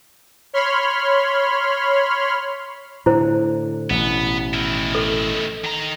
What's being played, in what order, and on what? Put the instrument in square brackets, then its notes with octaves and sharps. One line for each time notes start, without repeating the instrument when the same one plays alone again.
[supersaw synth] C#5 B5 C6 F6
[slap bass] A2 D3 [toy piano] E4 C5
[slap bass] A1 B2 [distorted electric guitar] B3
[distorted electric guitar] D#3 E4
[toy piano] A4
[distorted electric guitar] D#3 A#5